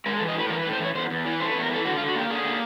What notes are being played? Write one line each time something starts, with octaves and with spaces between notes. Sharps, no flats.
G#3 A#4
A4
E3
D#5
A2 B4
E3 A#4
B4
A2
C5
E3 C#5
E2 C5
E2
E3
A3 C5
B4
E2
A#4
E3 A4
D3 F#4
F4
D3
F#4
A#3 G4
D3 G#4
A#3